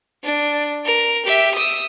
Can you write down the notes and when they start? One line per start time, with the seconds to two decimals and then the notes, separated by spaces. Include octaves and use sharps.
0.24 D4
0.85 A#4
1.25 G4 E5
1.55 D#6 E6